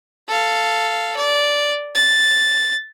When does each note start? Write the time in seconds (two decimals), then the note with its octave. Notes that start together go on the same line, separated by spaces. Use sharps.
0.28 A4 F5
1.17 D5
1.95 A6